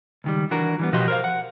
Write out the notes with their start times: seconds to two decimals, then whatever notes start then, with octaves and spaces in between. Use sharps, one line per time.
0.24 C#2 D#3 G3
0.51 E3 D4 F#4 A#4
0.79 E3 G3 B3
0.92 B2 F3 F#4 G4 D#5 C6
1.08 A#4 C5 F5
1.24 F#5